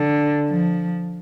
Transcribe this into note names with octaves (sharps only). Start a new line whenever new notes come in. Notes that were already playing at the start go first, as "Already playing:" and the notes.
Already playing: D3
F3